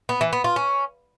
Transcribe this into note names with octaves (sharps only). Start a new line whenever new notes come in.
B3
E3
B3
F4
C#4